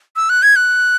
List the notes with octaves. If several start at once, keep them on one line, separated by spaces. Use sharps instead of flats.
E6
F#6
G#6
F#6